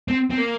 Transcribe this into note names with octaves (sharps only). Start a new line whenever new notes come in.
C4
C4
A#3